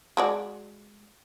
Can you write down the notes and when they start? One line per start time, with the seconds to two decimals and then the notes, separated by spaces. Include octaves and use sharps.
0.17 G#3 F#4 D5